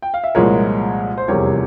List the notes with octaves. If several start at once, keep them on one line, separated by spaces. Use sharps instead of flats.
G5
F5
E5
C2 A#2 F3 G#3 A#4 C#5
C5
F1 E2 C3 G3 A#4 C#5